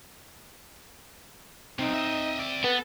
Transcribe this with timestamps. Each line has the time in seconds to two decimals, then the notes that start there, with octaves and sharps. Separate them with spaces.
1.79 B1 C3 C4 D#4
1.94 D#5 E5
2.39 D5 E5
2.64 B3 A4 B4